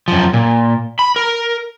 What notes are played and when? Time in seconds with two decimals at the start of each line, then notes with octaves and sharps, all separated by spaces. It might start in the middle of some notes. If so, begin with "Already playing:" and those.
0.08 F#2 F3
0.33 A#2
0.99 B5
1.16 A#4